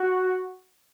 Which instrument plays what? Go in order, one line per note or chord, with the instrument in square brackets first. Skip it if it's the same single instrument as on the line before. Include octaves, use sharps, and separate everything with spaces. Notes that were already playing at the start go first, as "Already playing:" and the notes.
Already playing: [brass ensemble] F#4